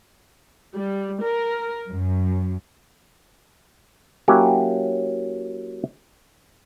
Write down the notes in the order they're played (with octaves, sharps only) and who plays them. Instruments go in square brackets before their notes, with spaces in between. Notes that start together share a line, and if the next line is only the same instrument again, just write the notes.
[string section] G3
A#4
F#2
[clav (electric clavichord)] F#3 A#3 C#4 E4 G4